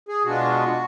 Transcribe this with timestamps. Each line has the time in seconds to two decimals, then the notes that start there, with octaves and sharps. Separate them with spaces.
0.08 G#4
0.24 B2 G#3 B3 D4 F4 F#4